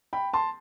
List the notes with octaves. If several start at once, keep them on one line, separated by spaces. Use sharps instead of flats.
G5 B5
A5 C6